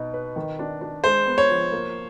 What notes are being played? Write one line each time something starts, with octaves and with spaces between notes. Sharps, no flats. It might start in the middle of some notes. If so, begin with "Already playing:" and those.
Already playing: B2 B3 D#4
B4
D#3
D4
D4
G#3 C5
B3
C#5
F3
A#3